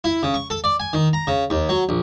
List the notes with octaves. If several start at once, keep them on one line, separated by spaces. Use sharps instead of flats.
E4
C#3
C#6
A4
D5
G#5
D#3
A#5
C#3
D#2
F#3
A#1